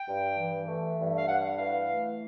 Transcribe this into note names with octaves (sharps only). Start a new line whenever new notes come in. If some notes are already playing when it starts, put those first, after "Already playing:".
Already playing: G5
G2
E3
A3
G2
F5
G2 F#5
E3 F5
A3